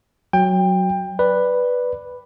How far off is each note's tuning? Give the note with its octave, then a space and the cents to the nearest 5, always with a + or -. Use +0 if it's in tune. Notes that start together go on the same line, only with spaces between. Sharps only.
F#3 +0 G5 +20
B4 +0 D5 +0